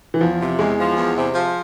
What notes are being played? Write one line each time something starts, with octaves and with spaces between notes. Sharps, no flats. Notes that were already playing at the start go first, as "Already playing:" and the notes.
E3
E2 F3
C3
E2 G#3
F3
E2
C3
F3